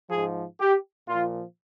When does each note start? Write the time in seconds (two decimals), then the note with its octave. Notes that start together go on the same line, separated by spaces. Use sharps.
0.10 G#2 F3 G#4
0.60 G4
1.08 A#2 F3 F4